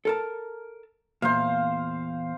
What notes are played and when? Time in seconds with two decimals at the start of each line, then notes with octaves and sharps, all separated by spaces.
0.05 A4 A#4 A5
1.22 E2 A#2 C5 F5